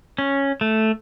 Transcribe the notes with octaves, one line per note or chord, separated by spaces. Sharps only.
C#4
A3